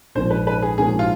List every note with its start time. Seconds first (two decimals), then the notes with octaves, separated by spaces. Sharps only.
0.15 A#1 G#2 F3 A#3 C#4 C5
0.31 B4
0.47 B4
0.63 G#4
0.78 A#1 G#2 F3 A#3 C#4 G#4
0.99 F4